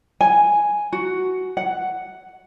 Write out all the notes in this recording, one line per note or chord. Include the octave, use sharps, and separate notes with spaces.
G#5
F#4
F#5